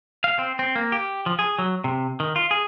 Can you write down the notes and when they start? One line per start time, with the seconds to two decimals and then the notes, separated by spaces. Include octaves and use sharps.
0.24 F5
0.39 C4
0.59 C4
0.76 A#3
0.92 G4
1.26 F3
1.39 G#4
1.59 F#3
1.84 C3
2.20 D#3
2.36 F4
2.51 G#4